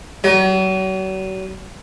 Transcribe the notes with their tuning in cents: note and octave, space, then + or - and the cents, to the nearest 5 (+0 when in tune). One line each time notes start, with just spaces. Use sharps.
F#3 +40